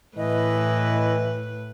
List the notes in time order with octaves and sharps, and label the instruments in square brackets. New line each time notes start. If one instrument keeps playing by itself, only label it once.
[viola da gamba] A2 B4 [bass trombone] E3 [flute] D#5